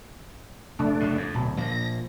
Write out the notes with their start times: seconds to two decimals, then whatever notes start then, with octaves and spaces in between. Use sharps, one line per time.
0.79 F1 A3 D4
1.00 F#1 A2
1.17 F2
1.34 D1 B2
1.57 A#2 F3 A#3 A#6